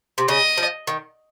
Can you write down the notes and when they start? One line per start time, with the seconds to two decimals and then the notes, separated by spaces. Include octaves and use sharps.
0.18 C3
0.28 C#3 D#5
0.58 F3
0.87 D#3